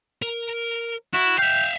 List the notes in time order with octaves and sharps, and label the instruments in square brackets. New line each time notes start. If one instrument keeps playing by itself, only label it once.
[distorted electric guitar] A#4
[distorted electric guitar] E4 [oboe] F#4
[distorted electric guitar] E5 F5 [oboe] G5